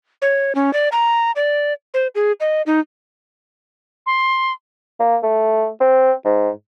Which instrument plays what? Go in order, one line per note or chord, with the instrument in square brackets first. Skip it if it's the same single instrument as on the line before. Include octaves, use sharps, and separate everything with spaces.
[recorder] C#5
C#4
D5
A#5
D5
C5
G#4
D#5
D#4
[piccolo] C6
[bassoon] A#3
A3
C4
G#2